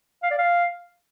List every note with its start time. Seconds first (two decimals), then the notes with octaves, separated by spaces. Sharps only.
0.23 F5
0.31 D5
0.38 F5